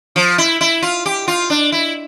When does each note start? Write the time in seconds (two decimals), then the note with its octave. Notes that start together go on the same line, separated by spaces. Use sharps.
0.16 F3
0.38 E4
0.61 E4
0.82 F4
1.06 G4
1.28 F4
1.50 D4
1.72 E4